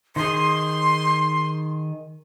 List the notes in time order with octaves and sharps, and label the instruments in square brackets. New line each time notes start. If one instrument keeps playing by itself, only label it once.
[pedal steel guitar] D#3 G#4 [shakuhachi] C6